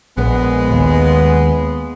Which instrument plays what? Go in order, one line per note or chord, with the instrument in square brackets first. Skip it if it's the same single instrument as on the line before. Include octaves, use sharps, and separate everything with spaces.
[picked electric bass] A#1 [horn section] G#3 B3
[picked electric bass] D#2